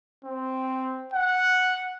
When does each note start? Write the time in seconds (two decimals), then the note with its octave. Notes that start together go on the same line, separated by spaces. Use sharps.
0.25 C4
1.14 F#5